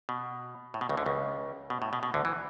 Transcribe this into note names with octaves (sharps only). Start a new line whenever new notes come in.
B2
A2
B2
C#2 C#3
D2 D3
C#2 C#3
B2
A2
B2
B2
D2 D3
E3